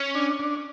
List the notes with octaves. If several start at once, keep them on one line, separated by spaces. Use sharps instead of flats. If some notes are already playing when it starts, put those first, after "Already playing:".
Already playing: C#4
D4
D4